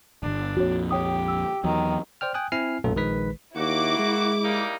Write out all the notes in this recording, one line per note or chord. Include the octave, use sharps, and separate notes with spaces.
D1 G1 D4
A#1 F2 F#4 C#5
G4 C#5 G5 D#6
E6
E2 D#3 F#3
C5 D5 G5 F6
G5 G#5 D#6 F#6
C4 E4 G#5 F6 C7
B1 F#2 A#2 A3 A4
A#1 D#3 G#3 B4 B6
D#2 A#3 E4 F#4 D6
G#3
G3 A#3 D#4